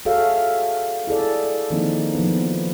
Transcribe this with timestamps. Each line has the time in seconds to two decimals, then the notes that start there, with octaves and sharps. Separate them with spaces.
0.05 F#4 G#4 A4 C#5 E5 F5
1.07 E4 G#4 A4 D5
1.70 D#3 F3 A#3 C4 D#4 E4
2.15 F3 B3